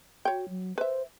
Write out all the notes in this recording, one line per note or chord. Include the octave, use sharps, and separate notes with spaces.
F#4 C#5 G5
F#3
B4 C5 E5